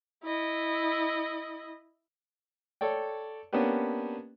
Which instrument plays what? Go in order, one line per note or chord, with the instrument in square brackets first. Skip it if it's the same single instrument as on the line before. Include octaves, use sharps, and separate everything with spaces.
[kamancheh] E4 D#5
[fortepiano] A4 C#5 D5 G5
A#3 B3 C#4 D4 G4 B4